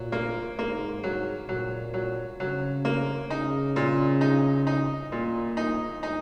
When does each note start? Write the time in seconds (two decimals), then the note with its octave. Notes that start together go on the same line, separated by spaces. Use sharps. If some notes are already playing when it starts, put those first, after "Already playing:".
Already playing: A#2 F#3
0.12 A#3
0.58 G#2 A#3
1.04 F#3
1.49 A#2 F#3
1.94 F#3
2.40 C#3 F#3
2.85 A#3
3.30 C#3 D#4
3.76 A#2
4.21 D#4
4.67 D#4
5.12 A#2 A#3
5.57 D#4
6.03 D#4